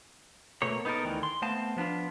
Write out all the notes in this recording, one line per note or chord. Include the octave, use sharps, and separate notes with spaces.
B2 A3 A#3 C#5
B3 D#4 G4 A4 A#4
D2 D#3 E3
C6
A3 B3 C4 F5 A5
F3 B3 D4 F4